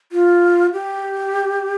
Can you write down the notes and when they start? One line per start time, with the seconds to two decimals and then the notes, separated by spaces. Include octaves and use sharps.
0.12 F4
0.73 G4